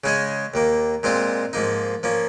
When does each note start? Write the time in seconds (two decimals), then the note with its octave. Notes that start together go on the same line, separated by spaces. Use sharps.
0.04 C#3 G#3 C#4 G#4 D#5
0.54 D#2 D#3 A#3
1.03 A#2 G#3 C4 F4 C5
1.53 G#2 F3 A#3 D#4
2.03 F3 A#3 C#4